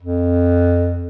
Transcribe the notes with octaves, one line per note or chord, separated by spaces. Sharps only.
F2